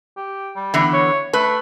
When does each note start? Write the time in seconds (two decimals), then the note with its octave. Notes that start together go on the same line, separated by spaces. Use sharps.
0.17 G4
0.56 G3
0.74 D3 E3 B3
0.93 C#5
1.33 A3 B4